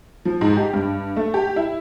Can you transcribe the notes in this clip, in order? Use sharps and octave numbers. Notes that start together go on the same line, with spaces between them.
F3
G#2
G4
G2
A3
G4
E4